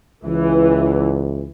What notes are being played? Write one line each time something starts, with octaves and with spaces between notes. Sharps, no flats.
C#2 E3